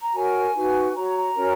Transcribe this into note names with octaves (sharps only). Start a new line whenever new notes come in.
A#5
F#4 A#4 C#5 G#5
D#4 F#4 B4
F#4 C#5 A#5
A#5
C#4 F#4 A#4 C#5